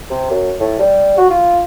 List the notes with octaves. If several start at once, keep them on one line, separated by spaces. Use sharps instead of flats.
C3
F#2
A2
G3
F#4
F4